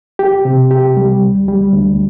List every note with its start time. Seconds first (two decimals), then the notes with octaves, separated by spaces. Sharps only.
0.19 G4
0.45 C3
0.71 G4
0.97 G3
1.22 D2
1.48 G3
1.73 D2